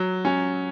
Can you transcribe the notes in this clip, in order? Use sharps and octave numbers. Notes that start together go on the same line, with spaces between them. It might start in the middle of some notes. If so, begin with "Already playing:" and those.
Already playing: F#3
C#4